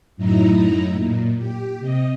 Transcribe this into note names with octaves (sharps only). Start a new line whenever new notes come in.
F#2 A2 F#3 D#4 E4 A#5
A#2
G4
C3 D#5